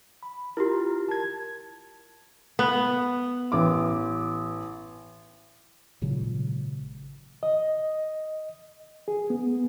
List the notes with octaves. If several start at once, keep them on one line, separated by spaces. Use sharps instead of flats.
B5
E4 F4 G4 A#4
A5 G#6
B3
A1 D6
G#1 A#2 C#3 F#3
D#5
G#4
B3